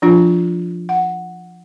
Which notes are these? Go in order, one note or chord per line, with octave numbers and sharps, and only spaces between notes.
F3 D4 F4
F#5